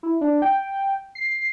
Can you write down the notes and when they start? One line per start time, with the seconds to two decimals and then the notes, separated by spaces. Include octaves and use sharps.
0.03 E4
0.21 D4
0.42 G5
1.15 C7